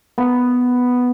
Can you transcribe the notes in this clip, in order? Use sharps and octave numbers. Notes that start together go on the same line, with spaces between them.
B3